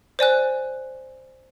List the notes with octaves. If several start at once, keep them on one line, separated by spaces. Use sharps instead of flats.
C5 D5 G#5 F#6